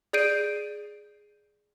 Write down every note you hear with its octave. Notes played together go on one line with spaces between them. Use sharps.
G#4 D5 G6 C7 D7 D#7